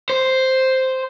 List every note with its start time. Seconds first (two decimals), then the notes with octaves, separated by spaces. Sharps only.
0.10 C5